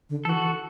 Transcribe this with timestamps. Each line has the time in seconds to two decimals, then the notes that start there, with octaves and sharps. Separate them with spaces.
0.10 D3
0.25 E3 F#4 A4
0.41 E3